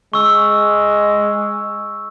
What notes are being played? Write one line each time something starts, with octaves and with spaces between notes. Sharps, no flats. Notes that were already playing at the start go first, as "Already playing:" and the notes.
G#3 C#6 E6